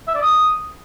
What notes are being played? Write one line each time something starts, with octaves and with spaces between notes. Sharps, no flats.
E5
D5
D#6